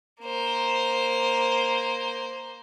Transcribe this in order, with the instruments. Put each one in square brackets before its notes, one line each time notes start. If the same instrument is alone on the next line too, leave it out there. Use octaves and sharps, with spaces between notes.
[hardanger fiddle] A#3 C5